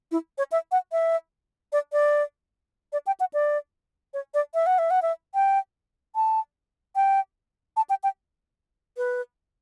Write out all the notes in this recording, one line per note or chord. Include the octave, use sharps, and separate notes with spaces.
E4
C#5
E5
F#5
E5
D5
D5
D5
G5
F#5
D5
C#5
D5
E5
F#5
E5
F#5
E5
G5
A5
G5
A5
G5
G5
B4